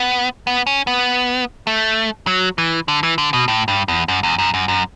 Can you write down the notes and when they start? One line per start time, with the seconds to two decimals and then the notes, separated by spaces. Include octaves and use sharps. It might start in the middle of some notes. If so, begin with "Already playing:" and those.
Already playing: B3
0.47 B3
0.67 C#4
0.87 B3
1.67 A3
2.27 F#3
2.58 E3
2.88 D3
3.03 E3
3.18 D3
3.33 B2
3.48 A2
3.68 G2
3.88 E2
4.08 F#2
4.23 E2
4.38 F#2
4.54 F#2
4.68 F#2